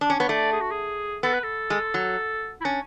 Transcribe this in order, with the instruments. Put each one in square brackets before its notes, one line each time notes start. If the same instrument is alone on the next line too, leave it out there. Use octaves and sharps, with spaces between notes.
[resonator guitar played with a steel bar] D4
C#4
[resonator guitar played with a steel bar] B3 [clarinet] C#5
[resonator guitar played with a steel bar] A3 [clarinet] D5
[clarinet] G#4
F#4
G#4
[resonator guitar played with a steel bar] B3 [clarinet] A4
[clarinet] B4
A4
[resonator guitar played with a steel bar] G#3
F#3
[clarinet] E4
[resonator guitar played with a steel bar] C#4 [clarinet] D4